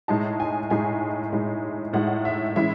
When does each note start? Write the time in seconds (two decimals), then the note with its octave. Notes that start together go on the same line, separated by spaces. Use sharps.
0.08 A2 G#3 D#4 A5
0.40 G#5
0.70 A2 G#3 D#4 G#5
1.33 A2 G#3 D#4
1.93 A2 G#3 D#4 F#5
2.25 E5
2.56 E3 G#3 C#4 E4 E5